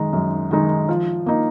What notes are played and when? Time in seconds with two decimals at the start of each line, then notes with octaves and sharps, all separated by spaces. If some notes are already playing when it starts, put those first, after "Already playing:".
Already playing: F#2 D#3 G#3 D#4
0.13 F#2
0.51 D#3 G#3 D#4
0.89 F3
1.26 A#3 D#4